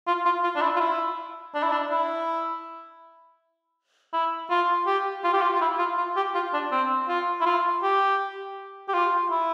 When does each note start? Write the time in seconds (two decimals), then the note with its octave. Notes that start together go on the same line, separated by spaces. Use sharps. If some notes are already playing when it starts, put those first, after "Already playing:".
0.07 F4
0.25 F4
0.43 F4
0.55 D4
0.62 E4
0.76 F4
0.80 E4
1.54 D4
1.63 E4
1.72 D4
1.91 E4
4.13 E4
4.50 F4
4.87 G4
5.24 F4
5.33 G4
5.42 F4
5.55 F4
5.61 E4
5.79 F4
5.97 F4
6.16 G4
6.35 F4
6.53 D4
6.71 C4
7.08 F4
7.41 E4
7.46 F4
7.82 G4
8.88 G4
8.94 F4
9.30 E4